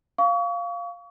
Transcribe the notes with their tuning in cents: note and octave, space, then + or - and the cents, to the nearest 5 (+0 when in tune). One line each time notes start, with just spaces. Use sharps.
F5 +0 C#6 +35